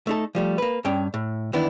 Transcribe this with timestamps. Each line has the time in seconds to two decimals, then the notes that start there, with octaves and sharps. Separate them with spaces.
0.07 A3 D#4 A4
0.35 F3 G3 A3
0.58 A#3 B4
0.85 G2 C#4 G5
1.14 A2
1.53 E2 D#3 B3 D4 E4